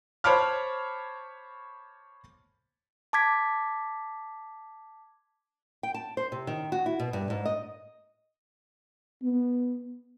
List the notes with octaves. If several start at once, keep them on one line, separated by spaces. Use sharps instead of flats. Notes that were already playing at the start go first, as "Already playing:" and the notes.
C5 C#5 A5 B5 D6 F6
A5 D6 G#6 B6
G5
A5
C5
C3
D#3
F#4
E4
B2
G2
G#2
D#5
B3